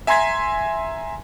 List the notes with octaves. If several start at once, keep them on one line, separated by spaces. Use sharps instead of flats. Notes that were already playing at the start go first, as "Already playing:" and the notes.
E5 G#5 A#5 C6 G#6 B6